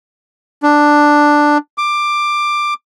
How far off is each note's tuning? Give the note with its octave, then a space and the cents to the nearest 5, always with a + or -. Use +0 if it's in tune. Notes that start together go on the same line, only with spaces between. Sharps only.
D4 +5
D6 +15